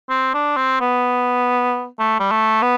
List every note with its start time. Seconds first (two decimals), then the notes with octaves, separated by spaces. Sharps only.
0.10 C4
0.34 D4
0.57 C4
0.80 B3
1.99 A3
2.19 G3
2.31 A3
2.62 B3